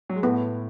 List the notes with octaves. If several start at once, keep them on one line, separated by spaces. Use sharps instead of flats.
F#3
G#3
A2 A3 B3